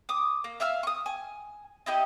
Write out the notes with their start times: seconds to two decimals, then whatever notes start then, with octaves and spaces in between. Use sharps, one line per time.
0.09 D6 D#6
0.44 A#3
0.60 E5 F5 E6 F6
0.83 C#6 D#6
1.06 G#5
1.86 D#4 E4 G4 D#5